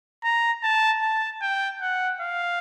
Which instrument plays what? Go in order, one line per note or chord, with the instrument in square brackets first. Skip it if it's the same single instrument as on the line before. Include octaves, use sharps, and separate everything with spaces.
[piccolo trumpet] A#5
A5
A5
G5
F#5
F5